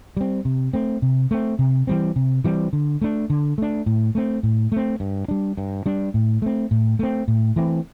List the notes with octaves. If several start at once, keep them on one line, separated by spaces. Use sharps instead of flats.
G3 C4
C3
A3 C4
C3
A3 C4
C3
E3 G3 C4
C3
E3 G3 C4
D3
A3 D4
D3
A3 D4
A2
A3 C4
A2
A3 C4
G2
G3 D4
G2
G3 D4
A2
A3 C4
A2
A3 C4
A2
E3 A3 C4